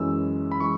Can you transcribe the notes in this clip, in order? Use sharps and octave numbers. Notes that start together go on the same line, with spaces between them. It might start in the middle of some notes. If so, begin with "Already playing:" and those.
Already playing: F#2 E3 G#3 C#4 E4 E6
B5
E3 G#3 C#6